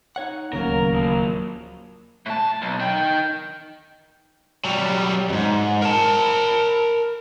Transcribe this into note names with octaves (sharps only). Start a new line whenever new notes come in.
D#4 C#5 F#5
D1 D#2 C#3 F#3 A#3 A#4
A#2 F3
A2 A5
B1
D#4 G5
F#3 G3
F2 G#2
A#4 A5